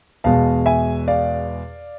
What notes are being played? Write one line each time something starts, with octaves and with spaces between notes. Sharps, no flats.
E2 B2 G#3 F5 A5
E5 G#5
D5 F5